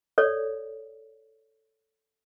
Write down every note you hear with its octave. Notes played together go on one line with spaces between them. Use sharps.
A4 C#5 D5